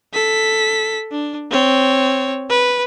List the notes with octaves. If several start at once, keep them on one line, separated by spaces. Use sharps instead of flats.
A4 B6
D4
C4 C#5
B4